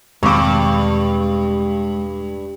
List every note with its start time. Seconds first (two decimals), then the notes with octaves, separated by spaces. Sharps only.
0.23 E1 G2 D#3 G#3 C4 C#6 D6